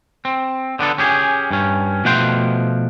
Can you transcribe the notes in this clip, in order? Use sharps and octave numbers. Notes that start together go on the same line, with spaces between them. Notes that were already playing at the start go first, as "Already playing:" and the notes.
C4
D3 B3 D4 A4
C#4 G4 G#4
G2 C#4
B2 F3 A3 F#5 G5 C6